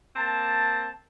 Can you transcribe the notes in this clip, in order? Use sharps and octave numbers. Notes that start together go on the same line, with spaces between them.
A#3 C4 A5